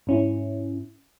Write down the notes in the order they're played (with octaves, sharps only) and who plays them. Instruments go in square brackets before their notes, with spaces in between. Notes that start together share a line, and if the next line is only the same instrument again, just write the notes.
[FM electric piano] G#2 C#4 E4